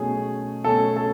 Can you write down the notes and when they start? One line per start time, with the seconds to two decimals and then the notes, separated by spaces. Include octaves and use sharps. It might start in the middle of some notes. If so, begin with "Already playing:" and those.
Already playing: B2 F#3 A3 C#4 G#4
0.64 B2 F#3 A3 C#4 A4
0.96 A4